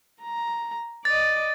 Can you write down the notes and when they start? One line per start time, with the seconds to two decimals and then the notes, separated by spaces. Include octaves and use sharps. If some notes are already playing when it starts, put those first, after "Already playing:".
0.22 A#5
1.05 D5 D#5 A6